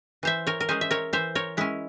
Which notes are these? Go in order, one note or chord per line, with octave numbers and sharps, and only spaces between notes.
E3 C5 E5
A#4 C#5
A#4
G#3 C#4 G#4 C5
E5
A#4 C#5
E3 C5 E5
A#4 C#5
G#3 C#4 E4